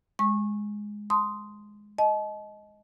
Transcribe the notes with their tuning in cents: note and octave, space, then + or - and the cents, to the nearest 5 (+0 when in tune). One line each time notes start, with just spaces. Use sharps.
G#3 +0 C#6 -25
A5 +0 C6 -5 D#6 +0
D#5 +5 A5 -40